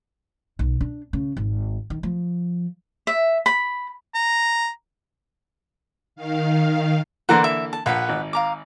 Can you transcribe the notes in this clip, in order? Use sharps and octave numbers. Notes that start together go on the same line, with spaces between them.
B1
D4
C#3
G#1
D#3
F3
E5
B5
A#5
D#3 F5
D3 E3 A#3 F#5 A#5 C6
E5
A5
A#1 B4 F#5 B5
G#1
F5 A#5 D6